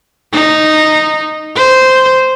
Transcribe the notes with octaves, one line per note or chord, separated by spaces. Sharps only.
D#4
C5